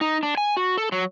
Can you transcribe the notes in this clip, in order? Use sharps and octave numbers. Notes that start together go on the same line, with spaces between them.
D#4
D4
G#5
F#4
A4
F#3